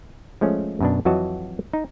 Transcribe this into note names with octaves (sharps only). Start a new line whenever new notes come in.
F3 G#3 A3 C#4
F#2 B2 D4
F2 E3 F#3 F#4 D#5 A5
D#4